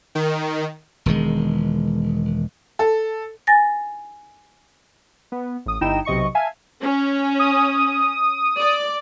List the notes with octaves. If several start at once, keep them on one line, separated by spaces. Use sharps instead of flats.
D#3
E1 D#3 G#3
A4
G#5 A6 A#6
B3
A1 D#6
G1 D#4 E4 G5 E7
B1 C3 D#5 C#6 C#7
E5 F5 G#5 A5
C#4
D#6
D5